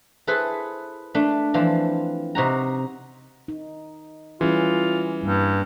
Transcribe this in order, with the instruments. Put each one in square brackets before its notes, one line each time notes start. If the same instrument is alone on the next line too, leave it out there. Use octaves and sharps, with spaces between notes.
[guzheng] E4 G#4 A4 B4 C5
A3 D4
E3 F3 C4 D4 E4 F4
C3 D#4 F#4 A#5
[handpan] D#4
[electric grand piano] E3 [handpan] G3 C#4 G#4 [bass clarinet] F4
[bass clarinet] G2 [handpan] G3 A#3